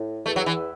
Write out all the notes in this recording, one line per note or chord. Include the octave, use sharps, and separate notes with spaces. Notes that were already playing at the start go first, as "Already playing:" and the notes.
Already playing: A2
E2 A3
F#3
E3